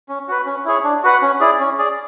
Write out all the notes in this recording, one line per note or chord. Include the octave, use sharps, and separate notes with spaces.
C#4
F#4 B4
C#4
E4 G#4 C#5
D4
F#4 B4 F#5
C#4
E4 G#4 D5
C#4
G#4 D5